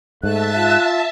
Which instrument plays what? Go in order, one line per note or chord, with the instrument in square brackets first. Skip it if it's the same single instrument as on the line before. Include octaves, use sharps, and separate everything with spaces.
[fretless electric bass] G#2 [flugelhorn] A3 [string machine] E5 A5 [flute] F#6
[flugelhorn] F4